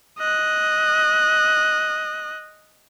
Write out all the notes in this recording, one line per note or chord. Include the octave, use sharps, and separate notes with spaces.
D#5 F#6